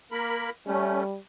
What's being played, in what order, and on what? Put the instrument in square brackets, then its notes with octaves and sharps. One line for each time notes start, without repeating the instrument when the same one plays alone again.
[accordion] A#3 A#4 B5
[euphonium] G3 [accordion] A3 C#4